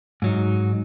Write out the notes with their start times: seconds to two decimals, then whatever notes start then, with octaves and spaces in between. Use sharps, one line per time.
0.22 G#2 F#3 D#4